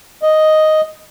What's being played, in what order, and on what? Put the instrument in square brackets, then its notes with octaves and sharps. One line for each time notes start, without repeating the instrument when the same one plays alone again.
[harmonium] D#5